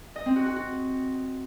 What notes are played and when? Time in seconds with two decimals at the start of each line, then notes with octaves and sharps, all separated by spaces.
0.16 D#5
0.26 C4
0.36 F#4
0.46 F#4
0.56 F#4